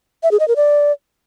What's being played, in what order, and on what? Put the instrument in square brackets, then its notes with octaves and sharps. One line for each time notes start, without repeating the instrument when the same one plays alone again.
[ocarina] E5
G#4
D#5
A#4
D5